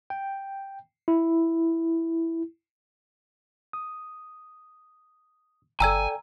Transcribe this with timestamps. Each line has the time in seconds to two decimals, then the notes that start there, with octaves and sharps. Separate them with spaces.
0.10 G5
1.08 E4
3.73 D#6
5.80 G1 A4 D5 G5 G#5 A#5 E6 G#6